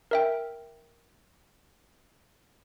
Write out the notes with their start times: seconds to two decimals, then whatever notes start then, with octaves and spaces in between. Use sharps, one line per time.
0.11 A#4 E5 G5